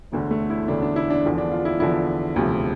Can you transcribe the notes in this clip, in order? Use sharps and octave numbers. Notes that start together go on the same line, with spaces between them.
E1 D2 D3
A3
E4
E1 D2 D3 D4
D4
E4
D4
E2 D3 F3
D4
F4
E4
E2 D3 F3 E4
E1 D2 C3 F3